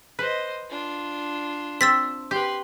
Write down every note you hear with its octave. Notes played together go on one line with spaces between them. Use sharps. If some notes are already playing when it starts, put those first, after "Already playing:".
B4 C5 D#5
D4 F4
C4 E6 A6 B6
G4 B4 C6